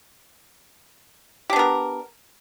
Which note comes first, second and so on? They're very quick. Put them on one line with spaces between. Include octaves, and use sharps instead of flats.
G4 D4 B3 A#4